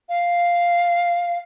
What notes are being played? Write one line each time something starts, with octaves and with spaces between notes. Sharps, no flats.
F5